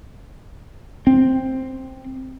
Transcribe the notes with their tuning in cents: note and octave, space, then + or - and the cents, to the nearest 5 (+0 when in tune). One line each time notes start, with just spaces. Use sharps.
C4 +5